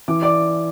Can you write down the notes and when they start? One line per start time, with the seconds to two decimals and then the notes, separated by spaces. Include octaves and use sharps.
0.08 E3 D6
0.22 D5 D6